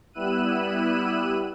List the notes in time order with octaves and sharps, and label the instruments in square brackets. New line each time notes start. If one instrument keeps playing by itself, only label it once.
[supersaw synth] G3 B3 E4 E6 F#6 D#7